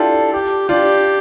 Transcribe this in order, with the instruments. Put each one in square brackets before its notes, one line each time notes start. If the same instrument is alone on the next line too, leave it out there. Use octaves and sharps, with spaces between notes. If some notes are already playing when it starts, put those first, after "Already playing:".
Already playing: [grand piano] D4 E4 F4 G4 [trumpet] A4
[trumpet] G4
[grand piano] D4 F4 [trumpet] G4